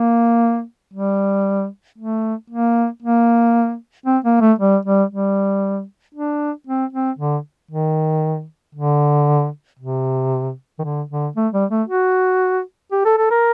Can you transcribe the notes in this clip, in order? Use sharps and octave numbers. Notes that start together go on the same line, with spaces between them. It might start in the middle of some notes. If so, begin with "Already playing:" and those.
Already playing: A#3
G3
A3
A#3
A#3
C4
A#3
A3
G3
G3
G3
D4
C4
C4
D3
D#3
D3
C3
D#3
D3
D3
A3
G3
A3
F#4
G4
A4
A4
A#4